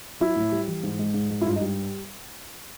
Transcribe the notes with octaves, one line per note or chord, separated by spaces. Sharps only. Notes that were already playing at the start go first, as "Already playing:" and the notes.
F#3 E4
A2
G3
E3
G#2
G#3
G#2
G#3
E4
G2 F4
D#4
G3